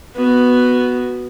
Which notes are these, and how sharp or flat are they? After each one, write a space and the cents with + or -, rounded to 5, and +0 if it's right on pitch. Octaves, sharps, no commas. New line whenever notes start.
B3 +0 F#4 +0